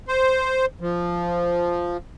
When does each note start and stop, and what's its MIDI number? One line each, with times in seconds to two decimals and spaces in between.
0.08 0.65 72
0.81 1.97 53